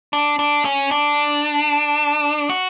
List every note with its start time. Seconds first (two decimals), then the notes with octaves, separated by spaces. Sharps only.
0.13 D4
0.39 D4
0.65 C#4
0.91 D4
2.49 F#4